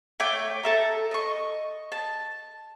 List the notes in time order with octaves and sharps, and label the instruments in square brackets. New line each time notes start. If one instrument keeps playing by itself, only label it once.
[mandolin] A3 C#5 G5 D6
A4 E5 A#5
D#5 C#6
A5